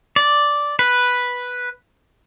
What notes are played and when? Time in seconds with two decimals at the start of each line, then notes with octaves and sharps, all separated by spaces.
0.16 D5
0.79 B4